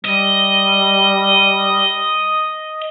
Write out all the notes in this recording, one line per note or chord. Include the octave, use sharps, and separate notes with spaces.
G3 D#5